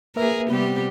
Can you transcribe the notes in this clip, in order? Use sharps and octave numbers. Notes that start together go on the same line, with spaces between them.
A#3 G#4 A#4 B4 E5
C3 G3 B3 C4 G4